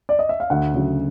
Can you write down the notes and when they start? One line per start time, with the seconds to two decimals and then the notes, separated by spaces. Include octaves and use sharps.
0.09 D5
0.19 D#5
0.29 E5
0.40 F5
0.50 D2 F#5
0.74 C#3 F#3